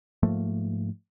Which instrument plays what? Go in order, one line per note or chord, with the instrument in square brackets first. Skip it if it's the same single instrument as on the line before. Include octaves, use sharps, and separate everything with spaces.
[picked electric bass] G#2 F3 A3 A#3